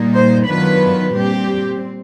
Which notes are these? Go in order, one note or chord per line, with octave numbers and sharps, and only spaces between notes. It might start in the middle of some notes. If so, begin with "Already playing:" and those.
Already playing: A#2 G3 A#3 D#4
C5
D#3 F#3 B3 D4 F4 B4
A#2 G3 C4 G4